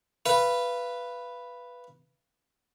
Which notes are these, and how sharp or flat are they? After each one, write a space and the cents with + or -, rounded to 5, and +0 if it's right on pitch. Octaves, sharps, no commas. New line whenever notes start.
B4 +0 F5 -30